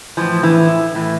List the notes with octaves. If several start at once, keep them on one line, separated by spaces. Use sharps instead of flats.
A2 E3 F3
E3
A2 E3